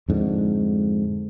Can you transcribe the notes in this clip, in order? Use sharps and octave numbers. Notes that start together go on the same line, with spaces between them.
F2 G#2 D3